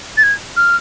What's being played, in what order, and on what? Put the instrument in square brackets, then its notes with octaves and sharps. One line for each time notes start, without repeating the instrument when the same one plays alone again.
[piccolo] A6
G#6
F6